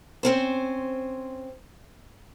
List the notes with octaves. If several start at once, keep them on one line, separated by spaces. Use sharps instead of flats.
C4 C#4 C5